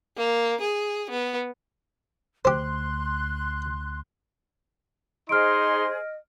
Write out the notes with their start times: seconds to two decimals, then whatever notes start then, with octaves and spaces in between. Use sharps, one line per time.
0.17 A#3
0.61 G#4
1.10 B3
2.45 D2 G4 C5 C6 F#6
5.29 D#4 G#4 C5 D#5 C6 F6 D7